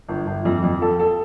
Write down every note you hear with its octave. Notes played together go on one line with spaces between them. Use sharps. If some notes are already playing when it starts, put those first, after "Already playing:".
G1
G1
F2
F2
A4
A4